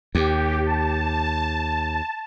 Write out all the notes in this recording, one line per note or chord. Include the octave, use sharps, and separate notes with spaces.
D#2 G4
A5